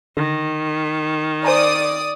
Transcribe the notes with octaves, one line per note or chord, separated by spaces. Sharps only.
D3 D#3
C5 D5 G#5 A#5 D#6